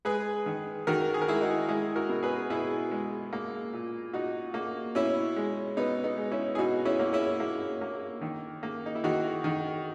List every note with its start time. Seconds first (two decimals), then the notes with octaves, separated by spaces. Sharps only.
0.05 G#3 G#4 B4
0.46 D#3
0.87 D#3 F#4 A#4
1.14 G#4
1.22 A#4
1.28 G#3 E4 G#4
1.41 D#4 F#4
1.68 G#3 E4 G#4
1.96 F#4 A#4
2.09 B2
2.23 G#4 B4
2.50 B2 E4 G#4
2.91 G#3
3.33 A#3
3.73 A#2
4.13 A#2 D#4 F#4
4.54 A#3
4.95 B2 C#4 E4
5.37 G#3
5.77 B2 B3 D#4
6.04 B3 D#4
6.17 G#3
6.31 C#4 E4
6.55 G#4
6.58 B2 D#4 F#4
6.85 C#4 E4
6.99 A#3
7.13 C#4 E4
7.40 A#3
7.81 A#3
8.21 D#3
8.63 A#3
8.86 D#4
8.95 E4
9.04 D#3 D#4 F#4
9.44 D#3